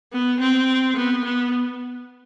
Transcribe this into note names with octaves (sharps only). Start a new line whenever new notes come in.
B3
C4
B3
B3